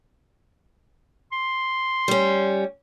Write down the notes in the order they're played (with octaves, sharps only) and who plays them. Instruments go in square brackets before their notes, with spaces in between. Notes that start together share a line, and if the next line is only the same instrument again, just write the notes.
[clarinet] C6
[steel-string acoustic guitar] G3 C#4